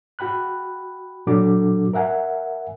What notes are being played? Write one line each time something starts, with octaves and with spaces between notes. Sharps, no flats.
F#4 G5 B5 F#6
A#2 F#3 D4 F#4 A4 D6
A#4 E5 F#5 G#5